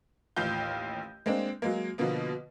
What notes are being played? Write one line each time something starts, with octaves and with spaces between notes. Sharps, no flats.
A1 D#2 F4 F5 G6
G#3 A#3 C4 D4
F#3 G#3 A#3
B2 D3 F3 A#3 B3